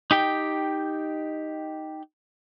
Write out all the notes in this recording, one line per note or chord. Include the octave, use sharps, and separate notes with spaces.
D#4 G4 G5